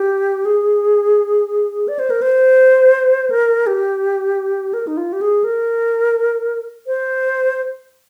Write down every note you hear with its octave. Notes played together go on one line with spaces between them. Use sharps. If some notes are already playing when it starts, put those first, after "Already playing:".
Already playing: G4
G#4
D5
C5
A#4
C5
A#4
G4
A#4
D#4
F4
G4
G#4
A#4
C5